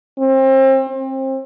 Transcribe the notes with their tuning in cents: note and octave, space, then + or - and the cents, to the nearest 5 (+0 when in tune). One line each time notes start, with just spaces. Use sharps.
C4 +30
C4 +30